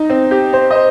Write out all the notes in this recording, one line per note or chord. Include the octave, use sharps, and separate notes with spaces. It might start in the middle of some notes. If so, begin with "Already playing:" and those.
Already playing: D#4
C4
G4
C5
D#5
C5